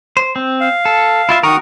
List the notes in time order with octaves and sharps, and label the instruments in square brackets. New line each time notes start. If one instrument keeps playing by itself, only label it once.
[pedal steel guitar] C5
C4
[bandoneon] F5
[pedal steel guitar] A4
E4 F4 E5
[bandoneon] D#3 C#6 D#6 [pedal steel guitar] F#4 A#4